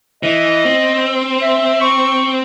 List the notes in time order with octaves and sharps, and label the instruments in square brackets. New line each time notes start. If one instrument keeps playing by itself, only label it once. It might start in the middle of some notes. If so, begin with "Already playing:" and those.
[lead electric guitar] E3 [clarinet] D#5
[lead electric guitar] C4
[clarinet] E5
C#6